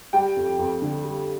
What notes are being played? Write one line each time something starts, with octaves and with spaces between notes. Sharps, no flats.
G3 G5
F2
F2
D3
G3